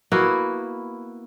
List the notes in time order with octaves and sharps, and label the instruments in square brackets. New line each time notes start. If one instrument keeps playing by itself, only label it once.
[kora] A#3 B3 E4 F#4